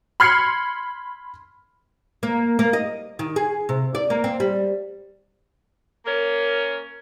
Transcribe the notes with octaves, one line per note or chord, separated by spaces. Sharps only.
B5 C6 F6 G#6 C7 C#7
A#3
A#3
D#5
D#3
G#4
C3
D5
A#3
C4
G3
A#3 C#4 A#4 C#5